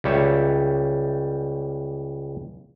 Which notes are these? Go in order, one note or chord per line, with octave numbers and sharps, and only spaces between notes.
C#2 G3 C#5 E5